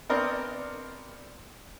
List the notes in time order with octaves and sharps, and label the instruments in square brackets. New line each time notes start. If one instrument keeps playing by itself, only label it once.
[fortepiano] B3 C4 D4 A#4 D#5